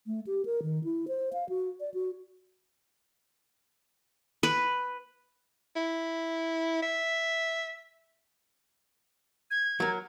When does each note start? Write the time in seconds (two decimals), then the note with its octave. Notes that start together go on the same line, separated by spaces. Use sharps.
0.07 A3
0.27 G4
0.45 A#4
0.63 D#3
0.84 E4
1.08 C5
1.33 F5
1.49 F#4
1.80 D5
1.94 F#4
4.43 B4
5.76 E4
6.82 E5
9.51 G#6
9.80 F#3 A#4